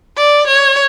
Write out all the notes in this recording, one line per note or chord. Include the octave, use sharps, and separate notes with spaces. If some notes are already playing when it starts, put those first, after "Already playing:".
D5
C#5